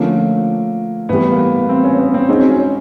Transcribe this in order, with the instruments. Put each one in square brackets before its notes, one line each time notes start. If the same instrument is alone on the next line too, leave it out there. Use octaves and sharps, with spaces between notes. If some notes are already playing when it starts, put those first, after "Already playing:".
Already playing: [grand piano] D3 F3 A3 C#4 [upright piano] A#3
[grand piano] A2 E3 G3 [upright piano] B3
[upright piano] A#3
B3
C4
C#4
B3
C4
[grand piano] G#3 C4 D#4 F#4 [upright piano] C#4
[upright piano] C#4